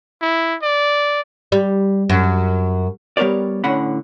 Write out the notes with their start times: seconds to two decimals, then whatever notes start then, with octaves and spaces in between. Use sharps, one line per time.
0.21 E4
0.62 D5
1.52 G3
2.09 F#2
3.17 G3 B3 A#4 C#5 D5
3.64 A2 D3 C#4 F#5 B5